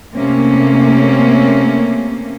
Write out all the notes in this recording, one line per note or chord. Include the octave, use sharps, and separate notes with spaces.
C3 A3 A#3 C#4